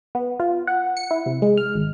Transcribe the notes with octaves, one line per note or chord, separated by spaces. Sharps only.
B3
F4
F#5
C#7
E4
C3
G#3
F6
G#1